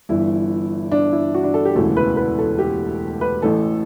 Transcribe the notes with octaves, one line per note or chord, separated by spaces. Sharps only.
G1 G2 E3 E4
D4
E4
F#4
D4
A4
G4
E1 D2 C#3 E3 A4
B4
B4
A4
G4
B4
A1 A2 E3 A4